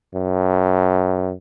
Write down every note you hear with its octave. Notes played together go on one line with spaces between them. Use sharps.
F#2